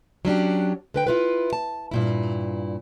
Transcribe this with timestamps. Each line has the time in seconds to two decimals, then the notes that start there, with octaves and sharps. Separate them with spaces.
0.25 F#3 C#4 D4 G4
0.94 D3 B4 G5
1.07 E4 F4 B4
1.53 A5
1.91 G2 A#2 E4